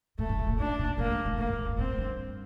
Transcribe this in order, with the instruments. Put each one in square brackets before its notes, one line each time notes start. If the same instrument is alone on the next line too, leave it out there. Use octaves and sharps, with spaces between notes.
[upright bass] A2 [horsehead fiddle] A3
[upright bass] G2
A2
A#2
[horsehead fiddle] D4
[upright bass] A#2
[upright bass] A2 [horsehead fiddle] A#3
[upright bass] G2
A2
[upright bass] A#2 [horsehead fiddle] A#3
[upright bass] G2
A2
G2
[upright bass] A2 [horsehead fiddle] C4
[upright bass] G2